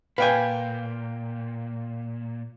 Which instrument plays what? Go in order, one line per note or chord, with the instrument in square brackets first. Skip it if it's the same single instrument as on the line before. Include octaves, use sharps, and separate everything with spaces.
[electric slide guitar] A#2 [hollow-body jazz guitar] B4 G#5 [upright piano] F5 G5 G6